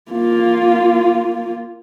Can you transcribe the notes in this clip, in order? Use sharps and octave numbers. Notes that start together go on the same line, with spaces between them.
A#3 F4